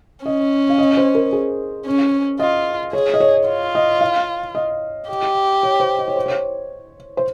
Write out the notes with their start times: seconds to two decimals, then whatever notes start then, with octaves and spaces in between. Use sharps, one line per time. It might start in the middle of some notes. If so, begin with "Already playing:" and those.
0.25 C#4 D#5
0.69 F5
0.78 D#5
0.97 C5
1.15 A#4
1.33 G#4
1.86 C#4
2.39 F4 D#5
2.93 G#4 C#5
3.14 D#5
3.20 C#5
3.48 F4
3.75 D#5
4.01 F5
4.55 D#5
5.09 G4
5.63 C#5
5.80 C5
5.99 D#5
6.08 C#5
6.16 C5
6.26 C#5
7.17 C5